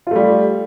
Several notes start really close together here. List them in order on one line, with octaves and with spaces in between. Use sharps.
F4 A3 G3